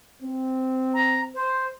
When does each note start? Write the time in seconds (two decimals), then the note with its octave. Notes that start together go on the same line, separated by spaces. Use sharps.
0.22 C4
0.94 A#5
1.34 C5